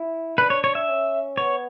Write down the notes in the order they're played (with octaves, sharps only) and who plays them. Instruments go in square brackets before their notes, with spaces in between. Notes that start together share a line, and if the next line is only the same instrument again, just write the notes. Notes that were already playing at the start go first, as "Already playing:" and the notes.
Already playing: [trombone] E4
[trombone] D4 [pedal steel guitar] B4
[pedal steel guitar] C#5
C#5
E5
[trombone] C#4
[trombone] B3 [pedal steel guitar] C#5